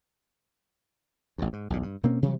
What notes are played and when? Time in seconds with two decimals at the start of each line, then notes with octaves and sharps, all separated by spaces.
1.38 A1 D#2
1.53 G#2
1.70 B1 E2 A#2
1.83 G2
2.03 B2 A#3 C4 C#4
2.22 C3 E3 F#3 G3